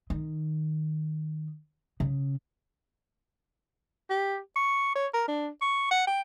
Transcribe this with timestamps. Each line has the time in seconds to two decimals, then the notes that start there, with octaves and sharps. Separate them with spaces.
0.10 D#3
2.00 C#3
4.10 G4
4.56 C#6
4.95 C#5
5.14 A#4
5.28 D4
5.61 C#6
5.91 F#5
6.07 G5